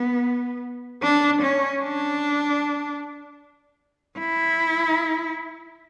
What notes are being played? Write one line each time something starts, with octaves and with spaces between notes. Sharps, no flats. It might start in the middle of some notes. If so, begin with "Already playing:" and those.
Already playing: B3
D4
C#4
D4
E4